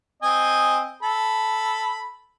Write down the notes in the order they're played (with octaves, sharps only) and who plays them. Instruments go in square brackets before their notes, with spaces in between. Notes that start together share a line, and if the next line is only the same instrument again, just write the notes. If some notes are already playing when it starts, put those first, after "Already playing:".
[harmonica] C4 D#5 G#5
A4 B5